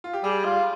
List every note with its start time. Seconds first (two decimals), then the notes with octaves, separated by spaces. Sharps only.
0.04 F4
0.13 G4
0.24 G3 G#4
0.45 F4